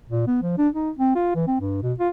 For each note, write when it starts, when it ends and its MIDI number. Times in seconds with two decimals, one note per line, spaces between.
0.09 0.27 46
0.27 0.39 59
0.42 0.55 53
0.58 0.68 62
0.74 0.90 63
0.99 1.11 60
1.15 1.31 65
1.35 1.47 52
1.47 1.56 60
1.60 1.80 43
1.82 1.93 47
1.99 2.09 65